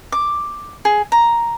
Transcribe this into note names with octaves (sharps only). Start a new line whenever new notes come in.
D6
G#4
A#5